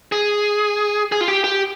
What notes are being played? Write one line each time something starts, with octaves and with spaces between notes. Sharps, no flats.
G#4
G#4
F4
G4
G4